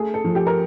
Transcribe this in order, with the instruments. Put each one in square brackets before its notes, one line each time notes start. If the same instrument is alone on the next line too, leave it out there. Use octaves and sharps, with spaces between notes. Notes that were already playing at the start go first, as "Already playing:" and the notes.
Already playing: [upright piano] A3 G#4
A4
F3
G4
A#4